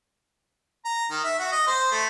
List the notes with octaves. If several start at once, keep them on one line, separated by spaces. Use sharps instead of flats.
A#5
D#3
E5
F#4
D#5
C5
A3